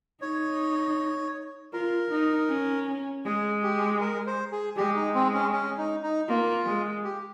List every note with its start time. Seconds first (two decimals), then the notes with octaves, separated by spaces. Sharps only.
0.22 D#4 C#5
1.73 F4 A#4
2.11 D#4
2.50 C#4
3.24 G#3 G#4
3.63 G4
4.01 A#4
4.27 C5
4.52 G#4
4.77 G#3 G4
4.96 D#4
5.15 C4
5.34 C#4
5.53 C#4
5.78 D#4
6.03 D#4
6.29 A#3 F4
6.66 G#3
7.04 G4